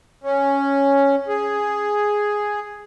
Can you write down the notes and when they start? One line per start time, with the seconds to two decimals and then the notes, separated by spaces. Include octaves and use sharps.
0.24 C#4
1.28 G#4